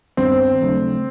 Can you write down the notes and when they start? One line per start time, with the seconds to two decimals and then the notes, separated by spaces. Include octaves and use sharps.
0.17 G2 D#3 G3 B3 C4 D4
0.60 D#2 C#3 F#3 A3 D4